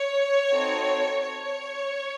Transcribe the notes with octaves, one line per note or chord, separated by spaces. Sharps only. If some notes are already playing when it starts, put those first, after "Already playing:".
Already playing: C#5
C4 D#4 F#4 A4
C#5